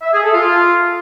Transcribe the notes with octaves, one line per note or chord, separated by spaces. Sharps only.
E5
G#4
A4
F4